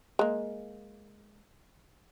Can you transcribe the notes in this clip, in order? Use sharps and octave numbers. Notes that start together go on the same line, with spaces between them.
G#3 A#3